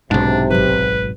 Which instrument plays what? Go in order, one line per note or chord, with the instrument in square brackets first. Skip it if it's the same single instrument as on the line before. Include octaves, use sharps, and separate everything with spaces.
[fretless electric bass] B1 G#2 [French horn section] C3 [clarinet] D4
[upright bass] G#1 F#3 [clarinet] B4